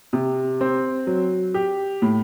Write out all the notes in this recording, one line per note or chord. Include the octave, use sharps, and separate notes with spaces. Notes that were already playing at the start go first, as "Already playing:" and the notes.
C3
C4
F#3
G4
A2